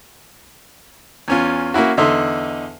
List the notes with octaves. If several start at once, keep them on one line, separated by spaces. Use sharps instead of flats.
E2 C#4 F4
A#3 C#4 E4 F#4
E2 D3 D#4 E5 C6